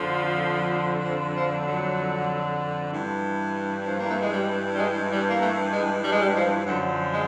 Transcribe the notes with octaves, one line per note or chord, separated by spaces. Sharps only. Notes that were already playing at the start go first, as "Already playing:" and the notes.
Already playing: F2 D3 F3
F3
F3
F#3
G2 E3
F3
A#3
A3
G#3
G3
G3
G#3
G3
A#3
A3
G#3
G3
G#3
G3
F3
F#2 D3 F3 F#3
G#3